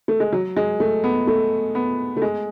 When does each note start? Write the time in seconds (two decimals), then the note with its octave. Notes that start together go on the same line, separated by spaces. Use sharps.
0.08 A3
0.20 G#3
0.33 F#3
0.57 G#3
0.80 A3
1.04 B3
1.27 A3
1.75 B3
2.17 A3
2.22 G#3